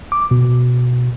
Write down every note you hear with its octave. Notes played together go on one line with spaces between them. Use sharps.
D6
B2